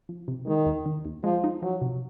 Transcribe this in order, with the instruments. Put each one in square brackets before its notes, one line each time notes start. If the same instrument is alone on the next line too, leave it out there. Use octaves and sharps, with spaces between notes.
[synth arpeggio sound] F3
C3
[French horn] D#3 [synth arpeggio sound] G#3
[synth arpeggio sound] D#2
D#3
D#2
[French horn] F3 [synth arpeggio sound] G#3
[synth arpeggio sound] D#4
[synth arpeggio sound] F3 [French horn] F#3
[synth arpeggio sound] C3